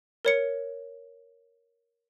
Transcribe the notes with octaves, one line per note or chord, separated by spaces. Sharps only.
A#4 C#5 C#7